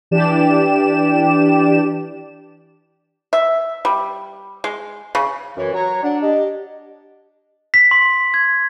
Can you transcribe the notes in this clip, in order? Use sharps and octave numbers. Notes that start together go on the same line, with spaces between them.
E3 D4 G4 D5 E7
E5
G3
G#3
C#3
F#2 E3 C#5
F#3 C#5 A#5
D4 F#5
G4 D#5
B6
C6
G#6